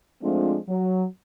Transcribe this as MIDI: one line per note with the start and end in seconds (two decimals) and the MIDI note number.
0.22 0.58 53
0.22 0.58 56
0.22 0.58 57
0.22 0.58 60
0.22 0.58 62
0.22 0.58 65
0.69 1.05 54